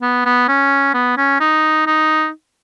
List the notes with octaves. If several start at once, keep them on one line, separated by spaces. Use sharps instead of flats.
B3
B3
C#4
B3
C#4
D#4
D#4